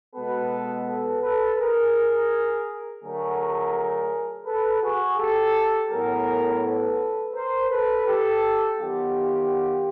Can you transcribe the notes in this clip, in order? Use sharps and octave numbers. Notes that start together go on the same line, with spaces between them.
B2 G#3 B3 A4 B4
A4 B4
A4 B4
G#4 A#4
D3 F#3 A3 G#4 A#4
A4 B4
F#4 G#4
G4 A4
A2 F#3 B3 G#4 A#4
A4 B4
A#4 C5
A4 B4
G4 A4
D#3 F#3 B3 F4 G4